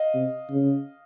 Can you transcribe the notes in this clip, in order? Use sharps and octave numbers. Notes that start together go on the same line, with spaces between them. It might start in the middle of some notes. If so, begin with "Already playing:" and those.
Already playing: D#5 F5
C3
C#3